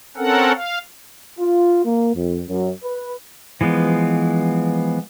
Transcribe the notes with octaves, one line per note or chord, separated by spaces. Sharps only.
C4 C#4 A4 A#4 F#5
F5
F4
A#3
F2
F#2
B4
E3 F3 G#3 B3